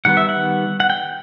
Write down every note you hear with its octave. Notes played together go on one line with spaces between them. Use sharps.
D#3 G3 B3 F#5
E5
F#5
F#5
G5